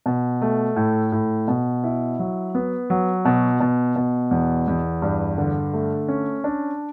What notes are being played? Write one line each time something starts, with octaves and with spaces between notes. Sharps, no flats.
B2
A3
A2
A2
B2
E4
F#3
B3
F#3
B2
B2
B2
E2
E2
G2
D3
A3
C#4
D4